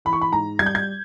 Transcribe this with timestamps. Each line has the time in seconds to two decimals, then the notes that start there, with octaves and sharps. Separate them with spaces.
0.05 E3 B5
0.13 C#6
0.21 B5
0.32 G#2 A#5
0.59 G3 G#6
0.66 G6
0.75 G#6